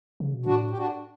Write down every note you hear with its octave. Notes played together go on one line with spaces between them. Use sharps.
C#3
B2
A2 D4 F#4
G4
D4 F#4